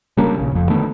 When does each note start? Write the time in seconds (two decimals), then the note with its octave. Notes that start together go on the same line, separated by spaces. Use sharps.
0.17 C#3 G3 A#3 D4
0.38 A#1 C#3 C#4
0.52 F1 F2
0.69 D3 D#3 A3 B3